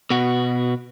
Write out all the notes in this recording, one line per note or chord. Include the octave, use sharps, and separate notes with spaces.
B2 F#4